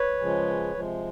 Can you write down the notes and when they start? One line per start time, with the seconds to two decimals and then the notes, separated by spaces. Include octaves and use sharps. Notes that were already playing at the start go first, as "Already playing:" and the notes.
Already playing: B4 C#5
0.19 C#3 F3 G#3
0.75 C3 F3 G#3